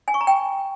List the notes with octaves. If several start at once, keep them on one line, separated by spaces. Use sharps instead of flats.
G#5
C#6
A#5
G5